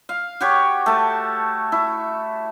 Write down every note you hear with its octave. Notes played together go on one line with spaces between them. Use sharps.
F5
F#4 G4 C#5
A3 A5
E4